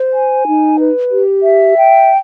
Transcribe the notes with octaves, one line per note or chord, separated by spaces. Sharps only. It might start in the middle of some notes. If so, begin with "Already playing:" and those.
Already playing: C5
G#5
D#4
B4
G4
E5
G5